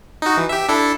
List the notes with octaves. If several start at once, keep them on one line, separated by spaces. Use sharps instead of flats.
D#4 F#4
E3
G4 E5
D4 E4 A4